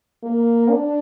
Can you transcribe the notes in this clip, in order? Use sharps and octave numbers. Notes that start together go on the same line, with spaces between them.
A#3
D4